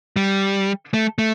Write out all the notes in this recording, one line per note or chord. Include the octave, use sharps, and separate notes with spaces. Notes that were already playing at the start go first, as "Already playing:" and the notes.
G3
A3
A3